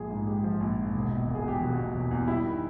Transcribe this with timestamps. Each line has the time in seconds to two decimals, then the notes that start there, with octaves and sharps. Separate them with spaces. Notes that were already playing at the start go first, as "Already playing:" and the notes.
Already playing: A#1 F3 G#3 G#4
0.11 G#2
0.27 G#3 G4
0.44 F3
0.60 A#1
0.78 G#2
0.94 E1
1.11 B2
1.28 E1
1.35 G#4
1.44 E2 G4
1.61 E1 F#4
1.78 B2
1.94 E1
2.11 E2
2.28 G3 E4
2.44 D#3